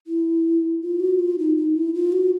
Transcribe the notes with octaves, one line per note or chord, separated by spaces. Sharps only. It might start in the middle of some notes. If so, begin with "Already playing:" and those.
E4
F4
F#4
F4
D#4
D#4
E4
F4
F#4